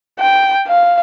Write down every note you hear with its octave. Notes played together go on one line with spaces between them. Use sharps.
G5
F5